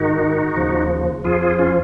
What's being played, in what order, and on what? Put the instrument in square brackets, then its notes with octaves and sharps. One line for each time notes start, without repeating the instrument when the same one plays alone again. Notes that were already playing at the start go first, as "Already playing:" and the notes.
Already playing: [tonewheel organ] G#2 D#3 D#4 F#4
D#2 C#3 F3
F2 F3 F4 G#4
F4 G#4
C#4 F4